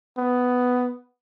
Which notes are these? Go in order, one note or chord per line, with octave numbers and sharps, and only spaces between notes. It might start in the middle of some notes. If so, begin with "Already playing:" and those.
B3